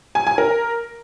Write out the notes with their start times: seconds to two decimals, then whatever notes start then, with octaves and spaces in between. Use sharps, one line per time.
0.15 G#5
0.27 G#5
0.38 A#4